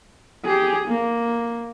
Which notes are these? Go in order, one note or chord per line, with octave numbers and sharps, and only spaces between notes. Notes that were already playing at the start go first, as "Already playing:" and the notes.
G4 G#4
A#3